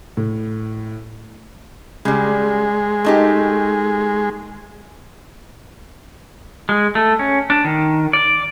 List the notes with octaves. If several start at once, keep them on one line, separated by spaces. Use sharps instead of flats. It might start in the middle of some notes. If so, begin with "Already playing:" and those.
A2
C#3 G3 G#3
A3 D#4 G4
G#3
A3
C#4
D4
D#3
D5